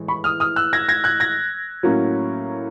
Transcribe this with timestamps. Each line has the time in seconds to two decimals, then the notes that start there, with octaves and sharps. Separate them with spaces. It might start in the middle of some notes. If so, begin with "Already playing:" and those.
Already playing: A2 E3 G#3
0.08 B5 C#6
0.24 D#6 F6
0.40 D#6 F6
0.56 E6 F#6
0.73 G#6 A#6
0.89 G#6 A#6
1.04 F#6 G#6
1.20 G#6 A#6
1.83 A2 F#3 A#3 C#4